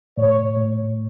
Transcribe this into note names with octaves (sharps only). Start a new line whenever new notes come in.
A2 C#5
A2